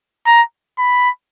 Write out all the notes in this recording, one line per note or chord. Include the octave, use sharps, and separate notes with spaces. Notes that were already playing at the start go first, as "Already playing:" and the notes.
A#5
B5